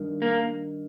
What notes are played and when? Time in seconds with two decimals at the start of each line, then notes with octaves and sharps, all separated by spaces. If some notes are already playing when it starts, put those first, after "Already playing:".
Already playing: G2 D#3
0.22 A#3